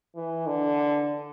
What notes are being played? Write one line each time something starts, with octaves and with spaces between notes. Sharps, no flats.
E3
D3